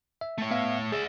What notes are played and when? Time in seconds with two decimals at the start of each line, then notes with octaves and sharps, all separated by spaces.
0.21 E5
0.38 A3 C#5
0.51 B3 E5 F5
0.92 G#4 D5 E5